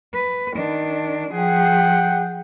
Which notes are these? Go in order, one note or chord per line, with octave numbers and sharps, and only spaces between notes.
B4
D#3 D4
F3 G#4 F#5 G5